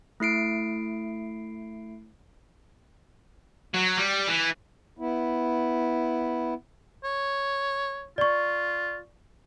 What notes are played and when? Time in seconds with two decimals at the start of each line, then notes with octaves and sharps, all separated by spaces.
0.20 A3 E4 C7 D7
3.74 F#3
3.97 G3
4.28 E3
4.99 B3 E4
7.04 C#5
8.18 F4 D5 C#6